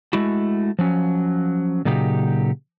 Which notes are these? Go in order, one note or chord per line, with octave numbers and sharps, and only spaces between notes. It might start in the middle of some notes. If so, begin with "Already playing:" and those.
G#3 A3 E4 F#4
F3 F#3 C#4
A#2 C#3 F#3 D#4 G4